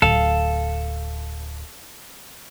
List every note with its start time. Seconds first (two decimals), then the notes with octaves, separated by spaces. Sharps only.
0.02 D1 A4 F5